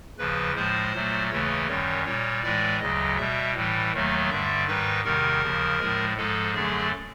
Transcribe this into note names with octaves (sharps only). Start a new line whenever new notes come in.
D#2 C#3 F3 B4
A2 F3 G#3 C5
A#2 F#3 A3
D#2 C#3 E3 A3 C#5
F#2 D#3 G3 C#5
A#2 G3 C#5
A2 E3 G#3 D5
D2 C#3 F#3 D#5
B2 G3 E5
A2 E3 G3
D#2 D#3 F#3 A3
G2 D3 G3 E5
G#2 D#3 G3 B4
E2 C3 D#3 G3 A#4
D#2 C#3 F3
A2 F3 G#3
G#2 F3 G#3 A4
F#2 D3 F#3 A3 G#4